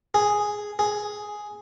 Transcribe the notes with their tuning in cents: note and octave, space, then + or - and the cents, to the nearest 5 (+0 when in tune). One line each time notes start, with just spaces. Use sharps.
G#4 +0
G#4 +5